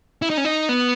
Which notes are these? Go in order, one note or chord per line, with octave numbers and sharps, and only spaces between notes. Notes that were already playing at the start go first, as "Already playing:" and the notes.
E4
D#4
C#4
D#4
B3